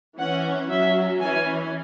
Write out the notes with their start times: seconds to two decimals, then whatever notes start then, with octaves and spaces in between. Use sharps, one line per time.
0.18 E3 C#4 F#5
0.69 F#3 C#4 E5
1.20 E3 C#4 G#5